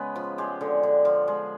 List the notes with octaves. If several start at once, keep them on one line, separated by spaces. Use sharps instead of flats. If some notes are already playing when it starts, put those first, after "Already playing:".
Already playing: C#3 G#3 B3
F3
G#3 G4
D3
D3
F3
G#3